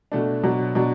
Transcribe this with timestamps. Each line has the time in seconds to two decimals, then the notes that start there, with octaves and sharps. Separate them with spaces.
0.12 B2 A3 D4
0.43 B2 F#3 D4
0.75 B2 F#3 D4